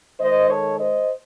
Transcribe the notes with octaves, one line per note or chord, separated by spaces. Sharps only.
D#3 G#3 C5 D#5
A4 C#5
C5 D#5